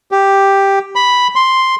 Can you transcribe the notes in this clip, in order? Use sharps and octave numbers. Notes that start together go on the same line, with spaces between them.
G4
B5
C6